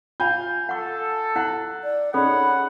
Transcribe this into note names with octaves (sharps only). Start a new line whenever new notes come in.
F4 F5 G#5 G6
A4 F#5 C#6
E4 F#5 F#6
D5
C#4 D#4 G#4 A4 F#5 B5